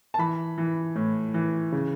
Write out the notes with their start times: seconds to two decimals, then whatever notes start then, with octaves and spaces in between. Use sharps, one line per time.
0.14 A5
0.19 E3 B5
0.58 E3
0.96 A2
1.34 E3
1.72 C#3